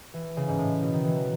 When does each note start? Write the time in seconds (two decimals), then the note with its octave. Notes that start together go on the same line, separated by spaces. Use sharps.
0.14 E3
0.37 C#3
0.48 G#2
0.58 A2
0.82 B2
0.93 D#3
1.04 E3
1.16 F#3